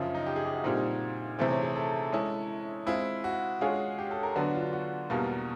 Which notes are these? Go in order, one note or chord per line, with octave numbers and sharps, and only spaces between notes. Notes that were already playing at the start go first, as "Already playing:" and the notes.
Already playing: F#2 C#3 F3
D#4
G4
G#4
G4
F#4
A#2 G3 C4 D#4
C3 E3 A3 C4 G#4
C#5
G#4
A4
G#3 C#4 E4
G#3 C4 E4 F4
F#4
G#3 C#4 F4 G#4 C#5
G4
A4
A#4
D3 F#3 B3 D4 F#4
F4
F#4
F#4
E2 B2 G3 A#3